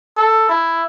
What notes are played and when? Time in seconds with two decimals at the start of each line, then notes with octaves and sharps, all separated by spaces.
0.17 A4
0.49 E4